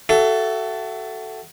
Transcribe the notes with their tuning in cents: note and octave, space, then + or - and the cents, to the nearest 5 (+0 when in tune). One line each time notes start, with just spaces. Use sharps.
F#4 +30 A4 +0 E5 +35